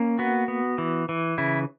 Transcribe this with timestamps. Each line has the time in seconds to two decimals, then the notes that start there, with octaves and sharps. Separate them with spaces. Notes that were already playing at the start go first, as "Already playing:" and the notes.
Already playing: A#3 C#4
0.19 B3 F#4
0.48 B3
0.78 E3
1.09 E3
1.38 C#3 E4